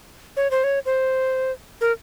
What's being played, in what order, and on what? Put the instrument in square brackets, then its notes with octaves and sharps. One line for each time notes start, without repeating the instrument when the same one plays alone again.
[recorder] C#5
C5
C#5
C5
A#4